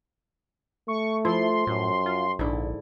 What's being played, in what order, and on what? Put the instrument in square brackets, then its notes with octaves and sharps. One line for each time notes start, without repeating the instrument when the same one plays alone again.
[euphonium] A3 [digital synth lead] C#6
[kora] F3 [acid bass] E4 [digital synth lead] C6
[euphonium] F#2 [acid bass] A2
[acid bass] F4
[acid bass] A#1 [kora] G#2 D3 E4